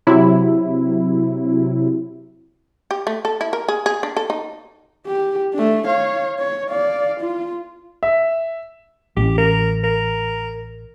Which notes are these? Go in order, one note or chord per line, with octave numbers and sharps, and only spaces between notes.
C3 F#3 E4
G4
A3
A4
E4
A#4
G#4
G#4
D4
A4
D#4
G4
A3 D4
C#5 F5
C#5
D5 F5
F4
E5
A1 G4
A#4
A#4